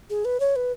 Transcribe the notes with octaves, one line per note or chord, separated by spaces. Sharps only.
G#4
B4
C#5
B4